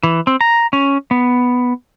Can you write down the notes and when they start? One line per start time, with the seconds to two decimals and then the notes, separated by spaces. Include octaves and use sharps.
0.03 E3
0.27 C4
0.41 A#5
0.73 C#4
1.11 B3